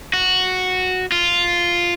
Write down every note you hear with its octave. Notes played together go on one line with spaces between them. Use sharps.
F#4
F4